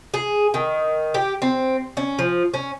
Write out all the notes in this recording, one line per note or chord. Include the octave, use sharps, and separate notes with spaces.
G#4
D#3
G4
C4
C#4
F3
C#4